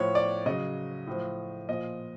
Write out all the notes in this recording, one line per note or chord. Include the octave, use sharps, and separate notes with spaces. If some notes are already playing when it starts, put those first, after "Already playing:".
Already playing: A2 F3 C#5
D5
C#3 F#3 D#5
A2 F3
A#2 F3 D#5